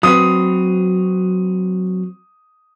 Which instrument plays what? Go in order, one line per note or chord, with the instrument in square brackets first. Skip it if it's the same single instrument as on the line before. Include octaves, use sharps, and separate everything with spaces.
[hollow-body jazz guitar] F#3 C4 B4 [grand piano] D#6